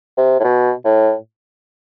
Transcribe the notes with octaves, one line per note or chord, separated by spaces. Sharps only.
C3
A2
B2
A2